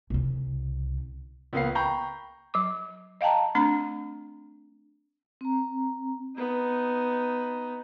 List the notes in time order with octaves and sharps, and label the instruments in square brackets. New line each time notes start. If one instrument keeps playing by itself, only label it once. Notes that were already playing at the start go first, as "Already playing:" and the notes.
[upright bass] C2 C#3
[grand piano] C#2 A#3 B3 F5 C7
G5 A#5 B5 C#6 G6
[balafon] F#3 D6
D#5 F5 G5 A5 A#5
A3 C4 D4 A#5
[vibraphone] C4 A#5
[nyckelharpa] B3 D#4